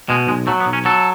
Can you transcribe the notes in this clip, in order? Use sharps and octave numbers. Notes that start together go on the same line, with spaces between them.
B2 G#3
B1 G#3
F#3 A3
B3
B1
C#4
F#3 A4